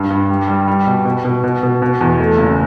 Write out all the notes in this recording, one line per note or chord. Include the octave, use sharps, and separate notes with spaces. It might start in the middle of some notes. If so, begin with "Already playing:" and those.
Already playing: G2
G2
G3
G3
G3
B2
B2
B2
B2
B2
B2
E2
A3
F#1